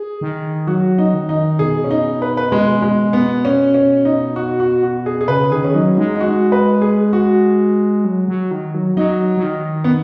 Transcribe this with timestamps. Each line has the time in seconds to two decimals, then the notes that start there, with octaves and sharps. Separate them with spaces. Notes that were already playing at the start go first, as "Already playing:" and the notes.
Already playing: G#4
0.21 D#3
0.67 F#3 F#4
0.98 D#4
1.14 D#3
1.29 D#4
1.59 B2 G#4
1.84 C#4
1.91 D#4
2.22 B4
2.37 B4
2.52 G#3
2.82 G#3
3.13 B3
3.45 C#4
3.74 C#4
4.05 D#4
4.36 F#4
4.60 F#4
4.83 F#4
5.06 G#4
5.21 G#4
5.28 C#3 B4
5.51 D#3 G#4
5.64 C#4
5.74 F#3 D#4
5.97 G#3 D#4
6.15 D#4
6.21 F#4
6.52 B4
6.82 G#4
7.13 F#4
8.05 F#3
8.28 F#3
8.51 D#3
8.74 F#3
8.97 F#3 D#4
9.37 F#3
9.43 D#3
9.84 B3